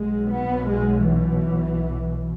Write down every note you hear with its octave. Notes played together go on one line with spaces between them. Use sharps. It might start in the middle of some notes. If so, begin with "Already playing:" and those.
Already playing: B1 B2 G#3
B3
G#3
E3